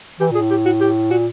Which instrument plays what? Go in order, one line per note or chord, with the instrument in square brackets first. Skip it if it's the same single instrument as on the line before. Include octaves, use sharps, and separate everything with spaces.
[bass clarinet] E3 [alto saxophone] G4
[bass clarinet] A#2 [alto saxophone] G#4
[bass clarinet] A2
[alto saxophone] G4
F#4
G4
[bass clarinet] A#2 [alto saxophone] F#4